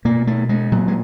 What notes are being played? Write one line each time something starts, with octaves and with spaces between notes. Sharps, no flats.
B2 A#3
A3
G#3
A#2 F#3
G#3